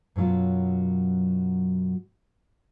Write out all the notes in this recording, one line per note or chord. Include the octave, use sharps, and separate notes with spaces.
F#2 B2 F#3 F4